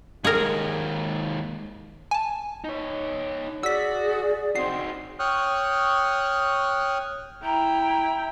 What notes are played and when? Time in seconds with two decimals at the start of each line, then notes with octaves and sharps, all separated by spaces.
0.24 D#2 G#2 G#4 A#4
2.11 G#5 A5
2.64 D#4 C#5
3.63 F#4 G#4 D5 E6 B6
4.56 C4 D#4 F#4 C7
5.19 C#5 G5 C#6 D#6 F6 F#6
7.44 E4 G5 A#5